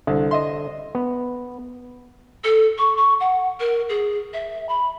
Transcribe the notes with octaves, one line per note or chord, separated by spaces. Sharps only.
C2 D3
D#5 E5 C6
B3
A4
C#6
C#6
F#5
A#4
G#4
E5
B5